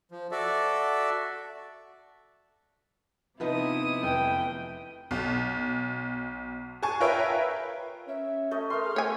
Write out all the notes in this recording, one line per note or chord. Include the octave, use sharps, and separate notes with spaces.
F3
F#4 A4 D5 E5
C3 F3 B3 D#4 E4 D#6
F1 B3 G5
B1
G#4 G#5 A5 C#6
F4 A#4 B4 C#5 E5 G5
C#4 E5
A3 D#5
A#4 C6 F6
G#4
A3 C#5 G#5